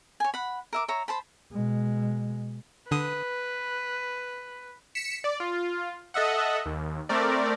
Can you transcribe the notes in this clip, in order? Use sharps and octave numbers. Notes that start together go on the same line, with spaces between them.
C#5 G#5
F#5 B5
A#4 E5 D6
C#5 E5 A#5
C5 A5 B5
B2 G#3
D3 B4 D#6
B6 C#7 E7
D5
F4
A4 D#5 E5 F#5
D#2
A3 C4 A#4 D5